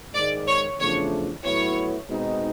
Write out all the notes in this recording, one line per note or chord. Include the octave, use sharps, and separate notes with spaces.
G#2 D#3 G#3 D5
C#5
E2 C#3 F3 A3 D4 C#5
A2 F#3 B3 E4 C#5
B2 G#3 C4 D#4